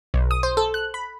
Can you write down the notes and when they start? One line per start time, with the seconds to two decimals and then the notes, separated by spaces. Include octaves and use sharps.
0.14 B1
0.31 D#6
0.43 C5
0.57 A4
0.74 F#6
0.94 B5